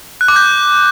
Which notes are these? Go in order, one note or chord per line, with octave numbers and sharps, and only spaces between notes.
F#6
D6
G6